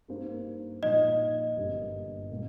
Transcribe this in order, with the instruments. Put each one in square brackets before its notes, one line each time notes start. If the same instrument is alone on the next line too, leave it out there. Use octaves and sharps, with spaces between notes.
[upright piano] G2 G3 A#3 D#4 C5
[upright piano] A#2 F3 D#4 [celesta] D#5
[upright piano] G1 G2 G3 A#3
A#2 A#3